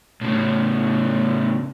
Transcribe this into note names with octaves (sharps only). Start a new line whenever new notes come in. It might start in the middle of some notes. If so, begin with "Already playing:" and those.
A2 C#3